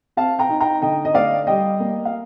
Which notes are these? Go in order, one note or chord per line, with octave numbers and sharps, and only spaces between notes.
C4 F5 A5
G5 A#5
D#4
G5 A#5
D3 D#5 G5
D#5
A3 D5 F5
G3 D#5 G5
A#3
F5